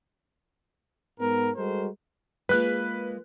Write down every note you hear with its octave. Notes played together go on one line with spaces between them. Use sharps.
G#2 B3 A#4
G3 G#3 F#4 A4 A#4 C5
G#3 A#3 F4 B4 F#6